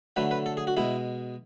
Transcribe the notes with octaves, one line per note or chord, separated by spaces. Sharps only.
D3 F#3 A3 B4
B4
A4
G#4
F#4
B2 G#3 E4